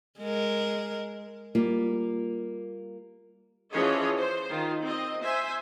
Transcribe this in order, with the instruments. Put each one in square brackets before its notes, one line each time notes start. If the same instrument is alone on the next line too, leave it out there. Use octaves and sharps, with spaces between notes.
[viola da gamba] G#3 A#4
[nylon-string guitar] G3 A#3 F4
[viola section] E3 F3 C#4 G#4 C#5 D#5
C5
D#3 F4
C4 D#5
C5 E5 G#5